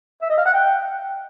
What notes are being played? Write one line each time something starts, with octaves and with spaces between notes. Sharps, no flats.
E5
D#5
F5
F#5
G5